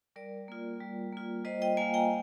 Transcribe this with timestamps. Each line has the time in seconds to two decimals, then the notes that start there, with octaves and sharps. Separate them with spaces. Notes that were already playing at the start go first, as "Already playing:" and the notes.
0.16 G3 A#4 D5
0.48 A#3 F4
0.81 G3
1.12 A#3 F4
1.45 G3 C5 D#5
1.62 D#5 G5
1.77 A#3 F4 F5 G#5
1.94 G5 A#5